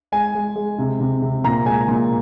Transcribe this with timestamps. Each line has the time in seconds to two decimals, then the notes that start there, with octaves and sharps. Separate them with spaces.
0.12 G#3 G#5
0.35 G#3
0.56 G#3
0.78 C3
1.00 C3
1.22 C3
1.44 A#2 A#5
1.66 G#3 G#5
1.88 A#2